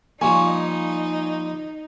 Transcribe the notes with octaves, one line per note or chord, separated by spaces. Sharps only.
F3 G3 A#3 D#4 G#5 C#6